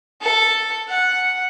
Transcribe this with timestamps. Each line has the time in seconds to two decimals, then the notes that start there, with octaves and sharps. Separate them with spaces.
0.21 A4
0.89 F#5